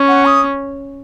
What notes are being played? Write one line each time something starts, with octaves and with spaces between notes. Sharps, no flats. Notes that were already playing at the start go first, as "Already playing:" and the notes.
Already playing: C#4
F#5
D#6